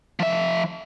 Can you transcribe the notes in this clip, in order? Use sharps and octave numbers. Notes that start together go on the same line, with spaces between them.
F3 E5